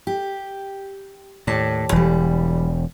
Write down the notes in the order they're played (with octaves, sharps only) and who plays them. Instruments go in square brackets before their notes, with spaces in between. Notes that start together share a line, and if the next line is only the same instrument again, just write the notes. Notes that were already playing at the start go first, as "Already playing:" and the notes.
[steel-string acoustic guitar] G4
[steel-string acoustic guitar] D#2 D5 A5 [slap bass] A2
[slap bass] E1 [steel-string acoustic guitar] E3 G3